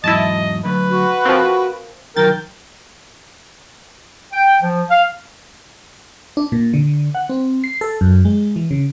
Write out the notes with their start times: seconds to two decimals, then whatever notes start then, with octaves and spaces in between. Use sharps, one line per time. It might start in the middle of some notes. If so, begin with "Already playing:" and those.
0.04 E2 G#2 F#3 E4 D#5 A5
0.65 D3 F#3 A3 B4
0.91 F#4
1.25 F3 C4 A#4 F5 C6
2.16 D#3 F#3 D#4 A#4 G5 A6
4.33 G5
4.61 F3
4.90 F5
6.37 D4
6.52 A#2
6.73 D3
7.15 F#5
7.29 C4
7.64 C7
7.81 A4
8.01 F#2
8.25 G#3
8.56 E3
8.71 C#3